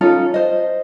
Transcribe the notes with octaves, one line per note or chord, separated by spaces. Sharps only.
C#4 D#4 F4 A4
C5 D#5